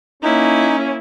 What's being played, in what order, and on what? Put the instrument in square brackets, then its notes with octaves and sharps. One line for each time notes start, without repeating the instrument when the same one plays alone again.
[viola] A#3 E4 [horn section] C#4 [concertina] D#4